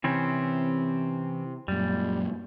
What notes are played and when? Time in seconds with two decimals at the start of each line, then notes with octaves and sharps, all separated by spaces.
0.04 C3 E3 C4 C#4
1.68 F#2 A#2 G3